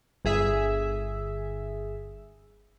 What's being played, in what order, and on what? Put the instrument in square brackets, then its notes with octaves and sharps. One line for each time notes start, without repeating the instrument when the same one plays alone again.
[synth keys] G1 G#4 E5